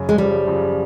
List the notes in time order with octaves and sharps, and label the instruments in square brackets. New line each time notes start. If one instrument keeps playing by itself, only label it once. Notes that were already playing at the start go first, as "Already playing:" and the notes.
Already playing: [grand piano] F#2 C#3
[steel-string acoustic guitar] G#3
[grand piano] F#2 C#3 F3 [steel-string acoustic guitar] G3
[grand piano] F#2 C#3 F3